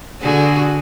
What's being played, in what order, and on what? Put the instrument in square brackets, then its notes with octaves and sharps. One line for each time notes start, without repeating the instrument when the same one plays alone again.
[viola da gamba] D3 F#4 G#4